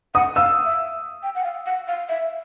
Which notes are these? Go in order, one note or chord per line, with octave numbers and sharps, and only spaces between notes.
F#5 D#6
F5 E6
E5
G5
F#5
F5
F#5
F5
E5